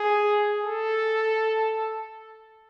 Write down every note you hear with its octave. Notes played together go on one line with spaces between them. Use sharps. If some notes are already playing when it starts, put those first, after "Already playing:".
Already playing: G#4
A4